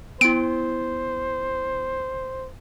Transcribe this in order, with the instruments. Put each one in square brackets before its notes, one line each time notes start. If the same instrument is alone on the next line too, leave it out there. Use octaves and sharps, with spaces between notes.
[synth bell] B3 E4 [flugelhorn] C5 [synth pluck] D7